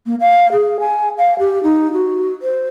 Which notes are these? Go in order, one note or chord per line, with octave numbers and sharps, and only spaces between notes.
A#3
F5
G#4
G#5
F5
G4
D#4
F#4
C5